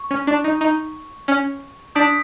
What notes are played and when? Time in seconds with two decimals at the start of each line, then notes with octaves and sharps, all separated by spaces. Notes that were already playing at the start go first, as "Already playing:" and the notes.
Already playing: C#6
0.11 C#4
0.27 D4
0.44 D#4
0.61 D#4
1.28 C#4
1.95 D4 D#6 G6 B6 D7